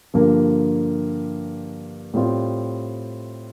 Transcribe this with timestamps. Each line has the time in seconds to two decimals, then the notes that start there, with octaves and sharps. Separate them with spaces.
0.14 G2 D3 F3 A#3
2.14 A2 G3 C4 F4